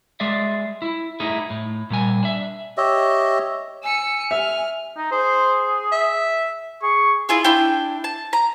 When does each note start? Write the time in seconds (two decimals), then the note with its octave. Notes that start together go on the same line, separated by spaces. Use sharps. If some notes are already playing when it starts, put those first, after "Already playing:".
0.20 G#3 G#4 D5 E5
0.82 E4
1.20 A3 D#4 E4 G#4
1.50 A2
1.90 A#2 G3 G#5
2.23 D4 E5
2.77 G4 C#5 D#5 E5
3.84 G#5 E6 C#7
4.31 E5 F6
4.97 D#4
5.12 G#4 C5
5.92 E5
6.82 G#4 C#6
7.29 E4 F4 G#4
7.44 D4 E4 G5
8.04 A5
8.33 A#5